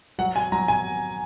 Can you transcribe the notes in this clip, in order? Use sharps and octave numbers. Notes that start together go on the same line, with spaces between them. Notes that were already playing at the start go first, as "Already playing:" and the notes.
F#3 F#5
G#5
F#3 A#5
G#5